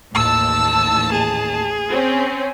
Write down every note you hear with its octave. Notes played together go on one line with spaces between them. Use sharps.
A1 D#2 A5 E6
G#4
C4 C#4